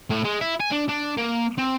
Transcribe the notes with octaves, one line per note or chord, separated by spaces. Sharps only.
A2
G#3
E4
G#5
D4
D4
A#3
C4